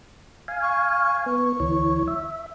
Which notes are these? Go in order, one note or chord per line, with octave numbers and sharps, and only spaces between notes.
F5 G#5
C#6
B3 C#6
D2 E3 C#5
E5